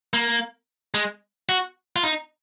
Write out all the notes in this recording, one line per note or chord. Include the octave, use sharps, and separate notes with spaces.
A#3
G#3
F#4
F4
D#4